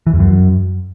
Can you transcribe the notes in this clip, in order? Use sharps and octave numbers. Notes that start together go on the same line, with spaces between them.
E3
E2
F#2